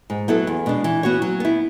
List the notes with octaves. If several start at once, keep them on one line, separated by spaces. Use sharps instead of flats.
G#2
F#3 B3 E4 A4
E2
B2 G#3 D4
E3
B3 F#4 C#5
F#3
B3 E4